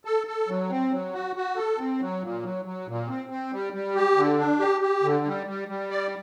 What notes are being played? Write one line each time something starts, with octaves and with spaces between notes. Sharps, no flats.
A4
A4
F#3
C4
F#3
F#4
F#4
A4
C4
F#3
A#2
F#3
F#3
A#2
C4
C4
G3
G3
G4
D3
D4
G4
G4
D3
G3
G3
G3
D5